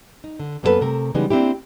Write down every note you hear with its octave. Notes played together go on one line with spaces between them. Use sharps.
D#4
D3
F#2 A#3 B3 D#4 A4 B4
C3 A3 A#4
C#3 E3 G3 G#3 B3 D#4
A#3 C4 D4 E4 G4